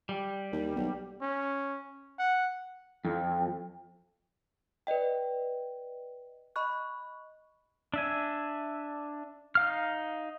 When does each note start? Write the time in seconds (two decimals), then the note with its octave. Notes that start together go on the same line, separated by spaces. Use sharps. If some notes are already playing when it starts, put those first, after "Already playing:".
0.09 G3
0.52 D#2
0.75 B1
1.21 C#4
2.18 F#5
3.05 F2
4.87 B4 D5 D#5 G5
6.56 D#5 B5 C#6 F#6
7.94 D4 E5 G#5
9.55 D#4 F5 F6